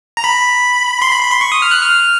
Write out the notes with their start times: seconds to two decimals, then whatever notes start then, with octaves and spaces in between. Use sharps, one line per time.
0.17 A#5
0.24 B5
1.02 C6
1.12 B5
1.23 B5
1.31 C6
1.41 C#6
1.52 D#6
1.62 F6
1.71 F#6
1.81 F6